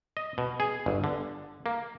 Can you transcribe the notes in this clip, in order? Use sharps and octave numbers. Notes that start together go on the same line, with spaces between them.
D#5
B2
G#4
G1
D3
A#3